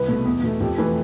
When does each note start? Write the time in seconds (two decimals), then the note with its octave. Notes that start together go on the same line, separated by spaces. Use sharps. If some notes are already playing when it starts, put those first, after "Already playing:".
Already playing: C2 B4
0.08 B2 A3
0.25 E2
0.43 B2 A3
0.60 F2 G4
0.78 E3 A3 B4